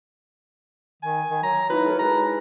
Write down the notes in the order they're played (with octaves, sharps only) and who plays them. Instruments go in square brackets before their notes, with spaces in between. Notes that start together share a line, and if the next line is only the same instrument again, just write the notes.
[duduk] D#3 [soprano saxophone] G#5
[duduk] D#3
[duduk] F#3 [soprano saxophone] A#5
[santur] D#4 E4 F#4 [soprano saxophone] B4
[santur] A4 A#4 C#5
[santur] G#3 [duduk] B4 [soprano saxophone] A#5